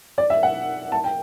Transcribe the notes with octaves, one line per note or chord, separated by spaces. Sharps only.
D5
E5
F#5
A5
G5